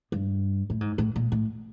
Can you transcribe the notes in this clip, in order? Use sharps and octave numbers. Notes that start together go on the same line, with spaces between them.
G2
A2
G#2
A2
A#2
A2